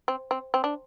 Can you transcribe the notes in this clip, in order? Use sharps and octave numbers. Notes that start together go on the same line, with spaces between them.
C4
C4
C4
D4